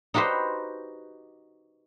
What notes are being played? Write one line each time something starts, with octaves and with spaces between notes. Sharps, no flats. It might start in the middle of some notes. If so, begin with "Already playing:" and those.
D#4 F#4 G4 B4 C5